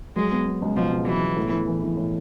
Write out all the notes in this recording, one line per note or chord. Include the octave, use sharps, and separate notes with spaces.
F#3 G#3
B3
B3
C#2
B2 F3
B2
E3 F#3
B3
A2
E3
E3
E3
A2